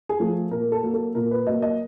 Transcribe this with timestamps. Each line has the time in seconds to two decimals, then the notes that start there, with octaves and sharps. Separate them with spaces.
0.09 G#4
0.20 F3 A3
0.51 A#2 A#4
0.72 A4
0.83 F#3 A#3
0.94 A4
1.15 A#2 A#4
1.31 B4
1.47 F#3 A#3 D#5
1.62 D#5